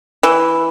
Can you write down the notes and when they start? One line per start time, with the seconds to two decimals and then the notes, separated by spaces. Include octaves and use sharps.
0.23 E3